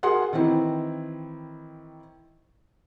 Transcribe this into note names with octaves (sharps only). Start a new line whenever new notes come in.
F#4 G#4 A#4 F#5 C6
D#3 E3 C4 E4